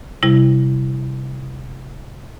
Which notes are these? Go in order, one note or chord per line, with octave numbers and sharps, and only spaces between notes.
C3 G3 E4